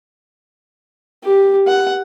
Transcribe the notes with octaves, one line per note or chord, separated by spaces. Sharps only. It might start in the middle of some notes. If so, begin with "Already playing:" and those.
G4
F#5